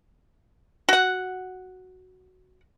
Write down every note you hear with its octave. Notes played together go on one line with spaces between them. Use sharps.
F#4 F#5